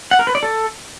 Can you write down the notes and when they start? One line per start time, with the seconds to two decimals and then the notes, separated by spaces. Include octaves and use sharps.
0.11 F#5
0.19 A#4
0.27 B4
0.35 D5
0.43 A4